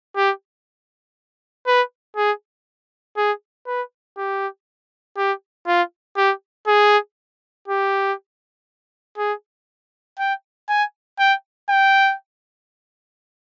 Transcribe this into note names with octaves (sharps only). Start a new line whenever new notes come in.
G4
B4
G#4
G#4
B4
G4
G4
F4
G4
G#4
G4
G#4
G5
G#5
G5
G5